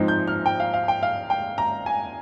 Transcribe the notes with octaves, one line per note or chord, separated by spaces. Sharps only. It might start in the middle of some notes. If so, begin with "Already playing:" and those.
Already playing: G#2 F3 C4 D#4
G6
F6
G5
F5
F5
G5
F5
G5
A#5
G#5